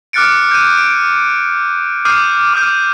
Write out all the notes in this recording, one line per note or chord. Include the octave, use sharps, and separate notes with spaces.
D6 F6 F#6 A6 C#7 D7
G6 D#7
D7
D6 D#6 F6 G6 C7 D#7
D6 D#6 F6 G6 D#7